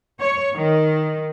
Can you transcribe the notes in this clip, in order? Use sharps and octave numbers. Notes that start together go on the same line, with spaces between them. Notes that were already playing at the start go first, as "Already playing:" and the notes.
C#5
D#3